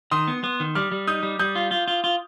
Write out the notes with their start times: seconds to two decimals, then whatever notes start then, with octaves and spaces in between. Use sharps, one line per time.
0.11 D#3 C6 D#6
0.28 B3
0.44 B3
0.60 D#3
0.75 G3 D6 F6
0.92 G3
1.07 D#4 D#6 G6
1.23 G3
1.39 G3 D#6 G6
1.55 F4
1.71 F4
1.88 F4
2.04 F4